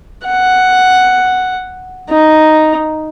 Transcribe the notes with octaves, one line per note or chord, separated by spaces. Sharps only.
F#5
D#4